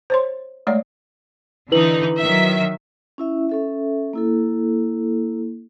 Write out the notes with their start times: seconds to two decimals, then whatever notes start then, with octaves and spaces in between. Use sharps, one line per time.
0.10 C5 C#5 C6
0.67 G#3 A3 C#5 D5 F#5
1.72 D3 E3 D#4 E4 B4 F#7
2.19 D#3 F#3 E5
3.18 C#4 E4 E5
3.49 C#4 A4 E5
4.13 A#3 E4 A4